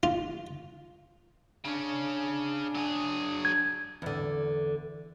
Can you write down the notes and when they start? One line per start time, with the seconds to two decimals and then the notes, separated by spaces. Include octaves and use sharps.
0.03 F4
1.65 C#3 C#4 D4
2.75 F#3 G#4
3.45 G#6
4.02 E2 D3